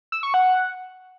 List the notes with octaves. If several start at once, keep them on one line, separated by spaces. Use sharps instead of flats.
E6
C#6
F#5